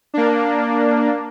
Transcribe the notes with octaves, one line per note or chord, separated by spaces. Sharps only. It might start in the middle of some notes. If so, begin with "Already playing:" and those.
A#3 D4